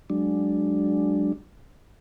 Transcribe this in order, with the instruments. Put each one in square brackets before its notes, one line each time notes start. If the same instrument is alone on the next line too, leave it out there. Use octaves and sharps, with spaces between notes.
[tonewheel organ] F#3 G#3 D4